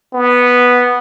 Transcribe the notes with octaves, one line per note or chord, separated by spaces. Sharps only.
B3